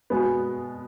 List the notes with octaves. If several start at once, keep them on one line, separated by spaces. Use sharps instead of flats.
B2 G#3 B3